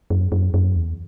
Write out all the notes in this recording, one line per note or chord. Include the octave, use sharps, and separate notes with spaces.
F#2
F#2
F#2
E2